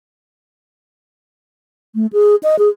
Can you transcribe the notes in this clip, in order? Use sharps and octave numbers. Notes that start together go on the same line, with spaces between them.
A3
G#4
D#5
G#4